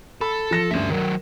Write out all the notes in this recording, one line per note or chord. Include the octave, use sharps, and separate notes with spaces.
A4 B5
F3 A#6 E7
D2 G2 C#4 E5
D#3 F#3 A#4